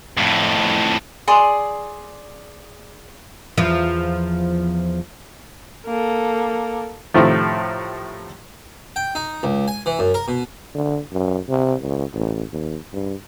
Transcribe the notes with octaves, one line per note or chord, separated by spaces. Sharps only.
F2 A2
G#4 D5 C6
E2 F3
A#3 A4
A2 C3 D#3 F3 A3
G5
D#4
C#2
G#5
E3
F#2
A#4
B2
D3
F#2
C3
C#2
A1
D#2
G2